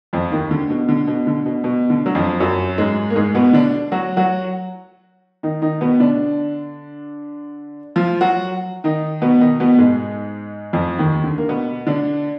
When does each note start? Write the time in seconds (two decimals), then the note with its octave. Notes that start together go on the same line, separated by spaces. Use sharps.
0.13 F2 F3
0.32 D#2 D#3
0.51 D3
0.70 B2
0.89 D3
1.07 B2
1.27 D3
1.46 B2
1.64 B2
1.90 D3
2.06 F#3
2.15 F2 F3
2.40 F#2 F#3
2.78 G#2 G#3
3.10 A#3
3.16 G#2 G#3
3.35 B2 B3
3.53 D3 D4
3.92 F#3 F#4
4.17 F#3 F#4
5.43 D#3 D#4
5.62 D#3 D#4
5.81 B2 B3
6.00 D3 D4
7.96 F3 F4
8.21 F#3 F#4
8.84 D#3 D#4
9.22 B2 B3
9.40 D#3 D#4
9.60 B2 B3
9.78 G#2 G#3
10.73 F2 F3
10.98 D#2 D#3
11.24 D3
11.38 A#3
11.49 B2 B3
11.87 D3 D4